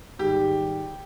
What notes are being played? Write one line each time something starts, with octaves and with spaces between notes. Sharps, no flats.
G#2 D#3 G3 G4